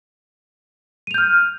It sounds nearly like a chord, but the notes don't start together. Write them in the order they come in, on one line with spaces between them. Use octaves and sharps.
D#7 F7 G6 F6